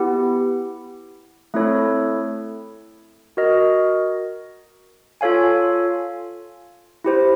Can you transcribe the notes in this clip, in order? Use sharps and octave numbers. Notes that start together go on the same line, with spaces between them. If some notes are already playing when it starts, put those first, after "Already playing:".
Already playing: B3 E4 G4
A3 C4 E4 A4 C#5
F#4 A#4 D#5
F4 A4 C#5 F5 G#5
E4 G4 C5